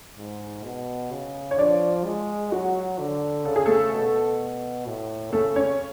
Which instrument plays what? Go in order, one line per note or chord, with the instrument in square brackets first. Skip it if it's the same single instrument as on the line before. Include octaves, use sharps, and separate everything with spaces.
[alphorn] G#2
B2
C#3
[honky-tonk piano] C#5
[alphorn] F3 [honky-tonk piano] D4 D5
[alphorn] G#3
[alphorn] F#3 [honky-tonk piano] F#4
[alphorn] D3
[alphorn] C#3 [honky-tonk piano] A4
[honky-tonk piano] G#4
A3 A4
[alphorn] B2
A2
[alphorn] C#3 [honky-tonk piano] A3 A4
[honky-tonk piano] C#4 C#5